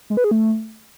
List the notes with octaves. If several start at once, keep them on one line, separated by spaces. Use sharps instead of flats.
G#3
B4
G#4
A3